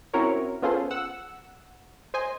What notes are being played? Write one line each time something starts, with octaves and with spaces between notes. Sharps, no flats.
C4 C#4 E4 F#4 A#4 C#5
B3 C#4 F4 G#4 A4 C5
F#5 E6
C5 D#5 G#5